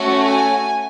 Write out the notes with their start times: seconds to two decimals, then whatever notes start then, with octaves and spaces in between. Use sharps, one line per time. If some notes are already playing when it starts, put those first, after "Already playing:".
Already playing: A3 C#4 F#4
0.28 G#5